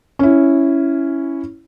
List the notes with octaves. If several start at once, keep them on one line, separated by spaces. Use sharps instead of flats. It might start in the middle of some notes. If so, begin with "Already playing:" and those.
C#4 E4